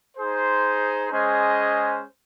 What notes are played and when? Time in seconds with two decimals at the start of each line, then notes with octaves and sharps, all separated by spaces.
0.17 D#4 G#4 C5
1.11 G#3 C#4 G#4 C5 D#5